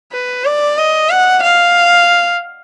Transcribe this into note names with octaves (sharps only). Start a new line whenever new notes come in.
B4
D5
D#5
F#5
F5